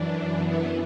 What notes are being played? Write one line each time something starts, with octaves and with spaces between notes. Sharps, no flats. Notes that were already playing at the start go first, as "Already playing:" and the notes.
Already playing: F#2 E3 D4
B3 E4